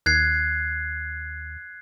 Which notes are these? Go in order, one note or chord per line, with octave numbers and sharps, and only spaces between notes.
D#2 F#6 G#6 C7